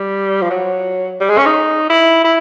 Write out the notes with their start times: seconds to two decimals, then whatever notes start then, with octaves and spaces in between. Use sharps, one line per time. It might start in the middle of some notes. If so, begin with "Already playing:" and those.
Already playing: G3
0.41 F3
0.50 F#3
1.20 G3
1.29 G#3
1.38 C#4
1.46 D#4
1.90 E4
2.24 E4